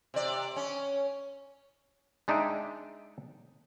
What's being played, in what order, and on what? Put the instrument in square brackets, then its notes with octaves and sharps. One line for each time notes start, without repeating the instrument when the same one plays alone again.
[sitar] C3 D5
C#4
[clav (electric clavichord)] G#3 D4 D#4 E5 G5